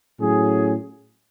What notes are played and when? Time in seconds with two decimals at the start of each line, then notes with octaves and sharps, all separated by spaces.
0.20 A2 F#3 C#4 G#4